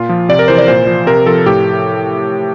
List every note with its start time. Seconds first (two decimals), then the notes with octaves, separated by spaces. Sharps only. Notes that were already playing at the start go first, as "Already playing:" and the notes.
Already playing: A#2 F4
0.09 F3
0.29 C3 D5
0.39 A#4
0.48 E3 C5
0.58 D5
0.68 A#2 C5
0.87 F3
1.07 C3 A#4
1.26 F3 A4
1.46 A2 G4